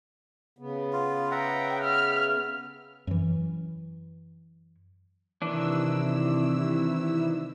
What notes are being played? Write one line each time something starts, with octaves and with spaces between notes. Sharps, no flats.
C#3 B3
F4
E5 F#5 G5 A#5
E5 F6
F#2 E3
C3 D#3 E3 D4 E4 E6